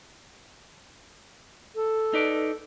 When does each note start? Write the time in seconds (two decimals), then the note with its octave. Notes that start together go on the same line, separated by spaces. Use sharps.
1.75 A4
2.13 D#4 B4 D5